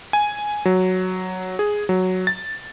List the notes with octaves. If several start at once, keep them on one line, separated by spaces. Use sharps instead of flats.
G#5
F#3
G#4
F#3
A6